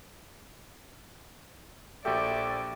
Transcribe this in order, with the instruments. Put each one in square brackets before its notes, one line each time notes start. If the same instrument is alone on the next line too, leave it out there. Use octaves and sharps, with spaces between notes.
[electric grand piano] A#1 F#4 A4 [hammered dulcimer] G4 [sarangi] D5 [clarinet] E5